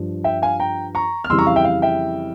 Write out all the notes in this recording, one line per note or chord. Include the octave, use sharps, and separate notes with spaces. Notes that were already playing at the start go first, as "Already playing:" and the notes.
Already playing: G2 F3
E5 G5
F5 G#5
G5 A#5
A#5 C#6
F6
F2 C#3 E3 G3 C6 E6
A#5 C#6
F5
E5 G5
F5
E5 G5